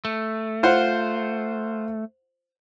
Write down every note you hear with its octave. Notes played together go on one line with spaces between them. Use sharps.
A3
F4 C5 F#5